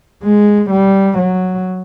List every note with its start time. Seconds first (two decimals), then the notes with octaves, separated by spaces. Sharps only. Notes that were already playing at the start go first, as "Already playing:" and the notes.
0.23 G#3
0.70 G3
1.18 F#3